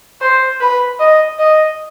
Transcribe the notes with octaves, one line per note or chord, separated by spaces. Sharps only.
C5
B4
D#5
D#5